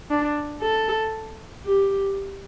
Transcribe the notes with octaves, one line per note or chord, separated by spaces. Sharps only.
D4
A4
G4